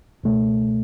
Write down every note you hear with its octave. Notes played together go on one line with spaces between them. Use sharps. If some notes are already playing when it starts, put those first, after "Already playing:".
C#2 B2 A3